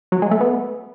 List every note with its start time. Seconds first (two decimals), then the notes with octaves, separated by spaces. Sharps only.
0.12 F#3
0.22 G#3
0.31 A3
0.41 B3